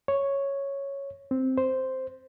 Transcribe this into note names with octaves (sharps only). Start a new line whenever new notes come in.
C#5
C4
C5